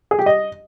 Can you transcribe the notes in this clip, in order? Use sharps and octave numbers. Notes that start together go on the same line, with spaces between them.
G#4
G4
D#5